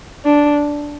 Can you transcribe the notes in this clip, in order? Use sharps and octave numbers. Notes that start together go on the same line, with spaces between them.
D4